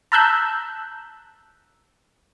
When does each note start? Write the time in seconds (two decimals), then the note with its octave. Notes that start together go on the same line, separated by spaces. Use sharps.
0.12 A5 A#5 E6 F#6 G6 B6